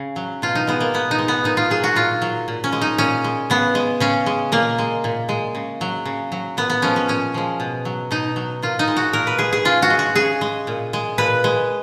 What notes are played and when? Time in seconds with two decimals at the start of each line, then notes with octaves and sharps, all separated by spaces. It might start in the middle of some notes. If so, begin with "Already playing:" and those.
Already playing: C#3
0.16 F#3
0.42 B2 F4
0.55 D#4
0.67 G#3 B3
0.80 A#3
0.94 B2 B3
1.11 D#4
1.19 G#3
1.28 B3
1.44 A#2 D#4
1.57 F4
1.70 F#3 G#4
1.84 F#4
1.96 A#2 F4
2.22 F#3
2.48 A#2
2.64 C#4
2.72 G#3
2.81 D#4
2.98 A#2 C#4
3.24 G#3
3.50 C#3 B3
3.75 G#3
4.00 C#3 C#4
4.26 G#3
4.52 A#2 A#3
4.78 G#3
5.04 A#2
5.29 G#3
5.55 C#3
5.81 F#3
6.05 C#3
6.32 F#3
6.57 A#2 B3
6.70 B3
6.82 F3 G#3 C#4
6.96 C#4
7.08 A#2 C#4
7.34 F3 G#3
7.60 B2
7.85 F#3
8.11 B2 D#4
8.36 F#3
8.62 A#2 F4
8.79 D#4
8.88 G#3
8.97 F#4
9.13 A#2 A#4
9.27 B4
9.39 G#3 G#4
9.53 G#4
9.65 C#3 F4
9.82 F#4
9.90 G#3
9.99 F#4
10.15 C#3 G#4
10.41 G#3
10.67 A#2
10.93 G#3
11.18 A#2 B4
11.44 G#3